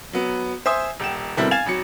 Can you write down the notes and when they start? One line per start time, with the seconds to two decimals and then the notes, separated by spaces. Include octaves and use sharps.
0.13 F#3 B3
0.66 C5 E5 G#5 D#6
1.00 D#1 G5 E7
1.37 B2 D3 G3 C4 E4 A#4
1.51 F5 G#5 G#6 A6 E7 F7
1.66 G#1 F#3 C#7